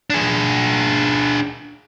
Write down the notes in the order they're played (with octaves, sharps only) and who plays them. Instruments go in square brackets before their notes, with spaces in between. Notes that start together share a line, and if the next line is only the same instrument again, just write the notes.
[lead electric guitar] D4 G#4